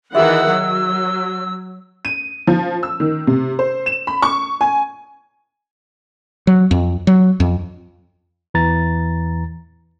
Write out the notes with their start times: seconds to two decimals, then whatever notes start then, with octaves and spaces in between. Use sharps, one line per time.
0.15 D#3 E3 F#4 G#4 E5 F#5 E6
0.51 F#3
2.05 D#7
2.47 F3
2.83 E6
3.00 D#3
3.27 C3
3.59 C5
3.86 E7
4.07 B5
4.22 C#6
4.61 G#5
6.47 F#3
6.71 F2
7.07 F#3
7.40 F2
8.54 E2 E3 A#5 A6